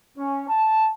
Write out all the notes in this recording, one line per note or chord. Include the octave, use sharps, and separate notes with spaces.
C#4
A5